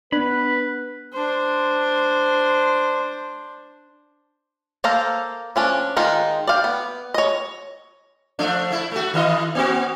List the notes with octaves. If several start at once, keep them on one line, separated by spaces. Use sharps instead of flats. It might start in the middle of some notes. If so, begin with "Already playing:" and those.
B3 D4 B4 B5
D4 C5
A#3 A4 C5 F5 A#5
F3 C#4 D4
D#3 G#3 D#4 F4
D5 F5 G5
B3
C#5 D#5
F3 A3 D4
A3 E4
A3 F#4
D#3 E4 D#5
A#3 C4 F#4